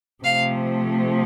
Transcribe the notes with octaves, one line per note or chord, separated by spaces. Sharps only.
C3 F3 A3 F5